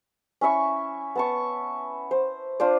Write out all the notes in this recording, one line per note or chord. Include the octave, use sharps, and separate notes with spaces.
C#4 E4 E5 C#6
B3 A5 C#6
C5
D4 F4 C5 D5